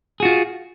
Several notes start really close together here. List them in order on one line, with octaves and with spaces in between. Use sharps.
G#4 F#4 F4